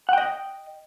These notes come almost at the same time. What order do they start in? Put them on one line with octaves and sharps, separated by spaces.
F#5 G5 D#5